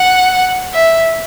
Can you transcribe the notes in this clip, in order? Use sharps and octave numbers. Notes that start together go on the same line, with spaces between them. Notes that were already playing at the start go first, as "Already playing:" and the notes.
Already playing: F#5
E5